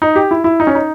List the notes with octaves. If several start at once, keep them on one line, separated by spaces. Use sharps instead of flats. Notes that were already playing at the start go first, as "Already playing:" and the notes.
D#4
G4
E4
E4
D#4
C#4
D#4